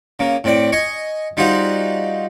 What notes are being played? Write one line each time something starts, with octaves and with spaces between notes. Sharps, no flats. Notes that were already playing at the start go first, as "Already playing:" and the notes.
C#3 A#3
A2 C4 D5
D#5 G#5 C#6
G3 D#4 F4 F#4 C5